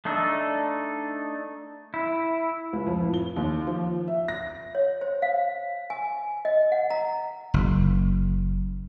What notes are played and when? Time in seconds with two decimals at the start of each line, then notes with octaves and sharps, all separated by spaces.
0.05 A3 D4 D#4 A4
1.94 E4
2.73 C#2
2.87 F2
3.01 A2
3.14 G7
3.37 D#2
3.67 F3
4.08 E5
4.28 A#6
4.75 C#5
5.01 C5
5.22 F5
5.90 G#5
6.45 D#5
6.72 F#5
6.90 A#5
7.54 F#1